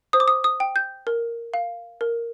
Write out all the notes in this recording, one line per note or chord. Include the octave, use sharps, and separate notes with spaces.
C5 D#6
D6
D#6
D#6
G5
G6
A#4
F5
A#4